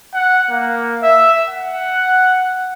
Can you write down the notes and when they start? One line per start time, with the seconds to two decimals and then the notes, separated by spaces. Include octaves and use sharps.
0.14 F#5
0.50 A#3
1.02 E5
1.48 F#5